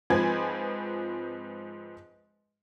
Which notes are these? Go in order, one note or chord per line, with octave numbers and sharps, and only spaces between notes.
G#2 F3 C4 B4 G#5 G#6